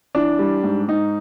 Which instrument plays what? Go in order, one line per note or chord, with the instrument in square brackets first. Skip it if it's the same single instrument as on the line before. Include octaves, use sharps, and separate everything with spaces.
[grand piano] E3 D4
G3
G#2
G#2 D#4